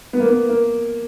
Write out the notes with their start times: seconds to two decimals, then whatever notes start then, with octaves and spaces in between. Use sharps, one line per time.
0.13 B3
0.20 A#3
0.29 B3
0.49 A#3